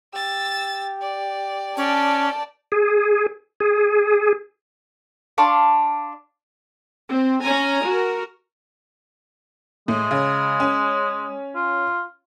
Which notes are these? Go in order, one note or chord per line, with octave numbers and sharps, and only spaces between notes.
G4 E6 A6
D5
C#4 D5 G5 A5
G#4
G#4
D4 F5 C6 C#6
C4
C#4 G#5 A#5
F#4 A#4
A2 G#3
C#3
C#4
F4